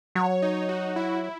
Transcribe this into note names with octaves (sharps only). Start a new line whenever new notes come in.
F#3 C#5
D#4
F#4
E4
E4